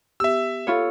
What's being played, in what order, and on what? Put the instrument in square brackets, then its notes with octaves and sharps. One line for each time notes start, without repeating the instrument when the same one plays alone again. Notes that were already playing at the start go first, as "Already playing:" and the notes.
[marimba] B3 G4 [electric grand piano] E5 E6
[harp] F4 C#5 [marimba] A4 B5